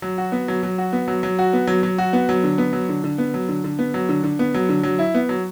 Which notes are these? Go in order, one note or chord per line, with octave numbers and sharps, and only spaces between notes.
F#3
F#4
B3
F#3
F#3
F#4
B3
F#3
F#3
F#4
B3
F#3
F#3
F#4
B3
F#3
D3
B3
F#3
D3
D3
B3
F#3
D3
D3
B3
F#3
D3
D3
B3
F#3
D3
F#3
E4
B3
F#3